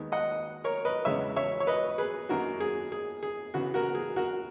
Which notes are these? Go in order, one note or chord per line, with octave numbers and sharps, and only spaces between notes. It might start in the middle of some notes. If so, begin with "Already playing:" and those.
Already playing: D#2 D#3 G#3 B3 D#4
D#5 F#5
A#4 C#5
B4 D#5
E2 C#3 G#3 B3 C#5 E5
C#5 E5
C#5
B4 D#5
G#4 B4
F#2 D#3 A#3 F#4 A#4
G#4
G#4
G#4
C#3 E3 B3 F#4
F#4 A#4
G#4
F#4 A#4